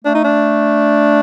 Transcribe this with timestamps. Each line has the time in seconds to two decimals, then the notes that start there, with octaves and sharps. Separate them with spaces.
0.04 A3 D4
0.14 D#4
0.24 D4